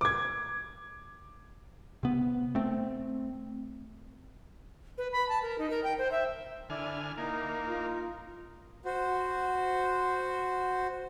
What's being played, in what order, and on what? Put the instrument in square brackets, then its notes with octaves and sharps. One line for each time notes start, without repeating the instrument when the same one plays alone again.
[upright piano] D6 G#6
[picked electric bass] C3 B3
A3 C4
[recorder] B4
B5
A5
A#4
D#4
A#4
G5
C5
E5
[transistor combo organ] D3 G#5 F6 [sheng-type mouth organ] E4 D5
[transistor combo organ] A#3 [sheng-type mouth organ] D#4 [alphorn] E4
[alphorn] F4
[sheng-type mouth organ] F#4 C5